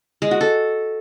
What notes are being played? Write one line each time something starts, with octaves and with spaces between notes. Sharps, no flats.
G#3
F#4
A4